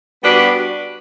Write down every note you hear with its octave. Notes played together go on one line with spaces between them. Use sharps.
G3 B3 D4 F#4 B4